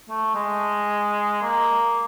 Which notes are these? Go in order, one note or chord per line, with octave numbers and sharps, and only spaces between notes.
A3
G#3
A#3